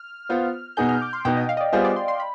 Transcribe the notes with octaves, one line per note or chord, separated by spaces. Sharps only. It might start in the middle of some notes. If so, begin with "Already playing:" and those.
Already playing: F6
B3 F4 C5 F6
B2 B3 D#4 G#4 G6
F6
D6
C6
B2 B3 D#4 G5
D#5
F5
D#5
D5
G3 B3 F4 G#4 C5 D#5
D5
C6
C6
B5